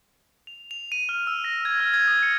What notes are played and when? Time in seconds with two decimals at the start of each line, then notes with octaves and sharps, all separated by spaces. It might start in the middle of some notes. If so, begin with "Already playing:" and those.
0.47 F7
0.71 F7
0.92 D#7
1.09 F6
1.27 E6
1.44 A#6
1.65 G#6
1.80 F6
1.94 G#6
2.08 D#6
2.23 C#7